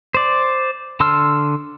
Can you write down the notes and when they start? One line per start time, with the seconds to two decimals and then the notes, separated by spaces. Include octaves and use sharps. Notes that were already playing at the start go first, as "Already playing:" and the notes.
0.14 C5 D5
1.00 D3 A5 C6 E6 F6